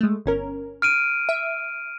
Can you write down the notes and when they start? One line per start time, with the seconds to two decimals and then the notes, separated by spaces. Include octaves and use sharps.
0.01 G#3 A3
0.26 G1 C#4 A#4
0.82 F6 D7 D#7
1.29 E5